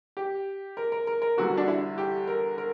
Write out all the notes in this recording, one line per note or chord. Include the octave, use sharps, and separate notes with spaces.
G4
A#4
A#4
A#4
A#4
E2 D3 G3 F#4
D4
E4
G4
A#4
A#4